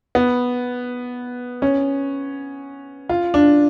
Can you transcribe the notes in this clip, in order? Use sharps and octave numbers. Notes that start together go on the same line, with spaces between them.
B3
C#4
F4
D4